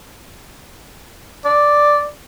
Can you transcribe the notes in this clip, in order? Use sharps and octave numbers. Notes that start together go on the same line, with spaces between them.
D5